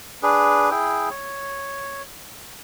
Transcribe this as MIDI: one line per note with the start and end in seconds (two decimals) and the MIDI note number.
0.23 0.70 62
0.23 0.70 68
0.23 0.70 71
0.71 1.09 64
0.71 1.09 68
0.71 1.09 79
1.10 2.02 73